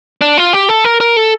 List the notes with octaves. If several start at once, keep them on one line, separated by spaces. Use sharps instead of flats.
D4
F4
G4
A4
A#4
A#4
A4